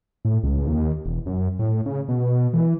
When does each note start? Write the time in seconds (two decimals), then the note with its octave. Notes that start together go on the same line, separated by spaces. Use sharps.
0.25 A2
0.43 C#2
0.67 D#2
1.06 E1
1.26 F#2
1.59 A2
1.86 C#3
2.09 B2
2.53 E3